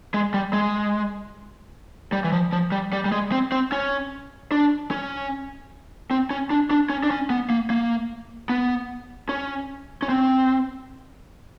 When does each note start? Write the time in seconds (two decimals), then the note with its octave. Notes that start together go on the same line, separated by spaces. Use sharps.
0.14 G#3
0.34 G3
0.53 G#3
2.12 G3
2.24 E3
2.32 F3
2.53 F3
2.72 G3
2.93 G3
3.05 G3
3.12 G#3
3.32 C4
3.52 C4
3.72 C#4
4.52 D4
4.91 C#4
6.11 C4
6.30 C#4
6.50 D4
6.71 D4
6.90 C#4
7.03 D4
7.11 C#4
7.30 B3
7.50 A#3
7.70 A#3
8.49 B3
9.29 C#4
10.02 C#4
10.09 C4